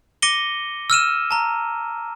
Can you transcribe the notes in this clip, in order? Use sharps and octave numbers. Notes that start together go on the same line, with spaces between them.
D6 A#6 C#7 D#7 G7
E6 F6 D#7 E7
A5 A#5